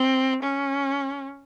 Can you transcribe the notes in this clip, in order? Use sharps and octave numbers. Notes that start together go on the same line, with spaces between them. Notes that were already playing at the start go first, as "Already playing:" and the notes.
Already playing: C4
C#4